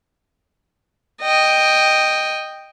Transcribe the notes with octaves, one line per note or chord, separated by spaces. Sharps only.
D#5 G5